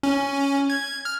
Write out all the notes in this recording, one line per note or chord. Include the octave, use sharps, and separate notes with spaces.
C#4
G#6
F6